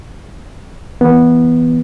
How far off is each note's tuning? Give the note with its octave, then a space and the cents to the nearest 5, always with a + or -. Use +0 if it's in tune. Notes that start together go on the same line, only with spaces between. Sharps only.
E3 +0 B3 -10